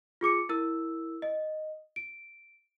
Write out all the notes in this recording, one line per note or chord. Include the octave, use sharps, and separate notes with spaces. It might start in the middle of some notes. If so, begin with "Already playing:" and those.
F4 G#4 D6 C#7
E4 A#4 E6
D#5
D7